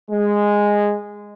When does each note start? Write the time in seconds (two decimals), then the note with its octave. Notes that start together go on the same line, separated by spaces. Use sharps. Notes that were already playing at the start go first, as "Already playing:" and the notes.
0.10 G#3